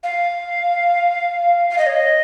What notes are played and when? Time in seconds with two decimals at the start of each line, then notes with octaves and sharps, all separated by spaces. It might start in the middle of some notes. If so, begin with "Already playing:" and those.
0.03 F5
1.70 F5
1.78 D#5
1.86 C#5
1.95 D#5